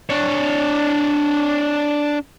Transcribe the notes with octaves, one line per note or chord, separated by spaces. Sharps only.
D4 C#5